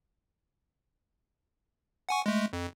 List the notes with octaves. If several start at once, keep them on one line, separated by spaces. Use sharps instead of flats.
F#5 G#5 C#6
G#3 A3
F2